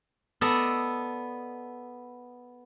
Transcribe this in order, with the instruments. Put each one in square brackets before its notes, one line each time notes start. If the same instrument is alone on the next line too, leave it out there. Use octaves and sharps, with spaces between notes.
[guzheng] B3 A4 D5 D#5 A5 A#5